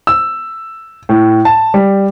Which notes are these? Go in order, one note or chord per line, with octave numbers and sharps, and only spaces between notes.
E6
A2
A5
G3